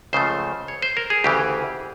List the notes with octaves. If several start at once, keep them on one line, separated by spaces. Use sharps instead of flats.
C#2 C#3 F3 A3 C5
C#5
C5
A#4
G#4
D2 C#3 E3 G4